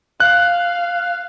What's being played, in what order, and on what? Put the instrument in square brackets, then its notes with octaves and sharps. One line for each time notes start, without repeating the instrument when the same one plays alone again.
[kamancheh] F5 [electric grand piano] F#6